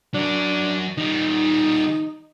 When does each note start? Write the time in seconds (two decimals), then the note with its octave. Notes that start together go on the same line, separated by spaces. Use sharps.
0.14 F#3 D4 A#4
0.97 D#3 G3 D#4